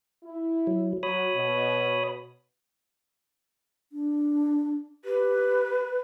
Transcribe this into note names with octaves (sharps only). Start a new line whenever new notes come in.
E4
F#3
F#3 F#4 C#5 B5 D#6
B2
D4
G4 B4